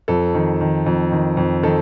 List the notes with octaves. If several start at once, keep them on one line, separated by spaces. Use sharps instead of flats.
F2 A4
D#3
D#3
F2
D#3
F2
D#3 A4